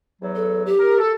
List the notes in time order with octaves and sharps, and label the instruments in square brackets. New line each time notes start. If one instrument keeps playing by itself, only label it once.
[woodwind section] E2 F#3
[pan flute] A4
G4
[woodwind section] A#4
A4